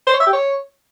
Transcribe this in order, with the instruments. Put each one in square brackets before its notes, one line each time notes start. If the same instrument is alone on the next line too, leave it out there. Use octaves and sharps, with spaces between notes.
[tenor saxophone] C5
C#5
E5
G4
C#5